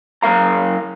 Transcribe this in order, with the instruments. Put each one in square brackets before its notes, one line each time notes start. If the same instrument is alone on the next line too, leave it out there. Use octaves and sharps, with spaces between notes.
[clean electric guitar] F#2 B2 A#4 F5 A#5